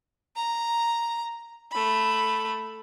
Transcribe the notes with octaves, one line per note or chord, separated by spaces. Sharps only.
A#5
A3 B5